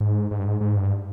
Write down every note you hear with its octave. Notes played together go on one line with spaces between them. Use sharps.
G#2
G#2
G2
G#2
G#2
G2